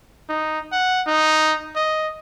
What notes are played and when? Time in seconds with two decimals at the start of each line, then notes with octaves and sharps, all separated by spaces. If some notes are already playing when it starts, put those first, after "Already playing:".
0.29 D#4
0.72 F#5
1.07 D#4
1.76 D#5